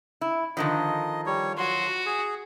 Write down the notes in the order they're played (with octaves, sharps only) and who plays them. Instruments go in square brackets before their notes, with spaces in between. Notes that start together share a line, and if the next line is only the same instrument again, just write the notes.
[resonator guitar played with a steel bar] E4
[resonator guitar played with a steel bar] D3 D#3 F3 [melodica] D#5
[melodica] G3 C#5
[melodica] F#3 C6 [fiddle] F#4
[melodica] G#4